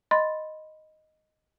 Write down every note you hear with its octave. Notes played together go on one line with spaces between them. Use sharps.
D#5 B5 C6 A6